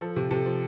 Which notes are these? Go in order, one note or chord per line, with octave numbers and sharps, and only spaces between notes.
F3 A4
C3
C3 A4
F3